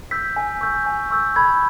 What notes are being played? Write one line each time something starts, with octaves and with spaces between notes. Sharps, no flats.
E6 G6 B6
G#5
C#6 E6 G6
G#5
C#6 E6 G6
B5 G#6